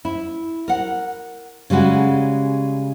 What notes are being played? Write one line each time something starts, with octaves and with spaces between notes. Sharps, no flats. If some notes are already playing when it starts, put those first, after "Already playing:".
E4
A#4 F#5
C#3 G3 G#3 F#4